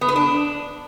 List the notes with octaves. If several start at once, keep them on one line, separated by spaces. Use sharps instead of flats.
B3
B4
D4